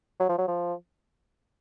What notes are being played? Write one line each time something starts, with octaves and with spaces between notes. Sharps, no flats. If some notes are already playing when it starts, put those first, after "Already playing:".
F#3
F3
F#3
F3